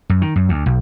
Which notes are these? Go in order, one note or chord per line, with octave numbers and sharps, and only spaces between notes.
F#2
D#3
F#2
D2
B1